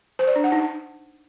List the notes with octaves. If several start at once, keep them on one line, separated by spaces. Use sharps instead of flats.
C5
D5
D4
F#5
D#4